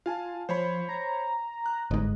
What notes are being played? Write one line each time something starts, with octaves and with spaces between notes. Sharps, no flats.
F4 F5 G#5 A5
F3 C5 C#5 B5
A#5
F#6
G1 G#2 D#5